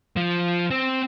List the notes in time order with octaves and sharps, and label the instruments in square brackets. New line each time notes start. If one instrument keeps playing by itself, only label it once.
[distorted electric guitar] F3
C4